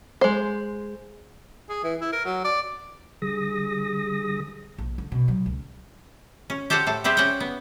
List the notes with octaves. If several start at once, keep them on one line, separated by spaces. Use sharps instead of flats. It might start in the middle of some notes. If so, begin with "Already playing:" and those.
G#3 C5
G#4
E3
E4
A#4
F#3
D5
D3 G3 G#4 D#6 A#6
A#1
D3
B2
F#3
C#2
C#4
G4 A4 C5 D5 F#5
A2 A4
G3 C4 E4 G4 G#4
C#4 F#4 D5 F#5 G5
B3